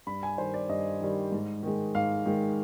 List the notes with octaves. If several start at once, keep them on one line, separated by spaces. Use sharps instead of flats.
G2 B5
G#5
D#3 G3 C5
D5
G2 D#5
D#3 G3
G#2
D#3 G#3
G#2 F5
D#3 G#3